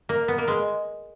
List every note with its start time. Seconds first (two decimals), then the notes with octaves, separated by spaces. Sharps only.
0.09 A#3
0.28 B3
0.38 A#3
0.48 G#3